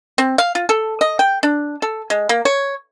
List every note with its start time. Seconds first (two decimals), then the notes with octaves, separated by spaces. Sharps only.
0.18 C4
0.38 F5
0.55 F4
0.69 A4
1.01 D#5
1.19 G5
1.43 D4
1.82 A4
2.10 G#3
2.29 A#3
2.45 C#5